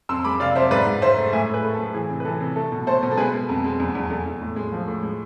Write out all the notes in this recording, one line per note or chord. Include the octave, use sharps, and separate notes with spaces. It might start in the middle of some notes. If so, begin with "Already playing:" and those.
F2 C6 E6
G#3 B5 D6
C3 D5 F5
F2 C5 E5
G#2 B4 D5
G#2
G#2 C5 E5
A3
A2 E5 G#5
A2
G#4 B4
A3
A4
A2
E3 G#4
C3
B4
E3 A4
C3
A3 A4
B2
A3 A4 C5
B2
A4
G#3 G#4 B4
G#3
F2
G#3
E2
E2
E2 A4
E2
A2
G#3
F3
A2
G#3